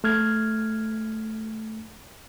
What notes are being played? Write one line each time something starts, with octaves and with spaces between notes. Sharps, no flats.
A3 F6 G#6